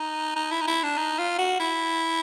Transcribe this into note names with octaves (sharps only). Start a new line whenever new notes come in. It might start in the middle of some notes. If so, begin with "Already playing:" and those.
Already playing: D#4
D#4
E4
D#4
E4
D4
D#4
F4
F#4
E4